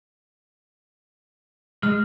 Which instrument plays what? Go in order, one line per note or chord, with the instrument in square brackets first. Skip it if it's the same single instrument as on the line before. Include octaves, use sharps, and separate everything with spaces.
[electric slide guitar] G#3 [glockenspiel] F6